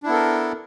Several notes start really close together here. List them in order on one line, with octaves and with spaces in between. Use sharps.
D4 E4 B3 A4 A#4